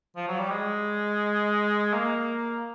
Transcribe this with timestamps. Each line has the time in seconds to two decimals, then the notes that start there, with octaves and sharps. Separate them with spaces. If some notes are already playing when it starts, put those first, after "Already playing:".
0.16 F3
0.28 F#3
0.39 G3
0.50 G#3
1.94 A#3